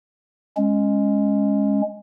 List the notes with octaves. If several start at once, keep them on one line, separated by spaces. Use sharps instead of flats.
G#3 C#4